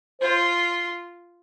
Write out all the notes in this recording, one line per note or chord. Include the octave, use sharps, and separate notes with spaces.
F4 C5